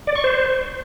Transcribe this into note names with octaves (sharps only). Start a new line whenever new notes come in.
D5
C#6
C5